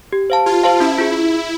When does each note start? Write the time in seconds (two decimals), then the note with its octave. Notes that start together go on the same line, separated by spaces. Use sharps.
0.12 G4
0.30 C5 F5 A5
0.46 F4 G4
0.64 C5 F5 A5
0.80 C#4 E4
0.98 F4 G#4